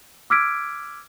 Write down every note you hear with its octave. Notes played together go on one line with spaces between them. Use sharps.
D6 E6 F6 G#6 B6 D7